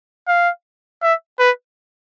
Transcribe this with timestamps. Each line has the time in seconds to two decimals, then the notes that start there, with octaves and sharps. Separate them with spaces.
0.27 F5
1.02 E5
1.39 B4